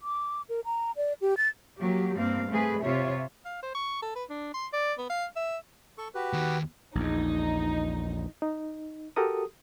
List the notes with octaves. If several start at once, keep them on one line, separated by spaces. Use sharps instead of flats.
D6
A#4
A#5
D5
G4
A6
F#3 A#3 G4
G2 A#3 C4 F5
A3 C4 G#4 B4
C3 F4 C#5 E5
F5
C5
C#6
A4
B4
D4
C6
D5
B3
F5
E5
A4 C#6
F#4 G4 B4
D#2 D#3
A#1 E2 D#4
D#4
F#4 G4 A4 A#4 D#6